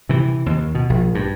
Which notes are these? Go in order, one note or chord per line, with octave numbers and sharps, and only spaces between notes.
C3 E3
D#2
B2
A#1
G2